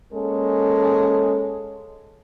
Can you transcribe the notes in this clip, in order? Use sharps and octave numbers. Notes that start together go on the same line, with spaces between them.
G#3 A#3 C#4 A4